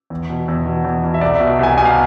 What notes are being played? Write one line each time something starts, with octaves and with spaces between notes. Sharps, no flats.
E2
B2
E2
B2
E2
B2
E5
C2 D5
B2 E5
C2 G#5
B2 G#5
F5